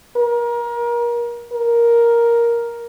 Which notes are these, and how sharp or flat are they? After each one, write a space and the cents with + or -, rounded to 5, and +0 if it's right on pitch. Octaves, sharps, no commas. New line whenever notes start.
A#4 +30
A#4 +5